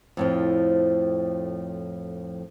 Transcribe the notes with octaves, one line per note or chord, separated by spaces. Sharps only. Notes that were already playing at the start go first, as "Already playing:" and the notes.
F2 A2 F3